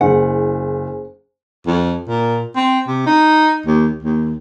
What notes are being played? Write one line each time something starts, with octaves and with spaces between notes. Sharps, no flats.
F#1 G#4 C5 F#5 G#5
F2
A#2
C4
C3
D#4
D#2
D#2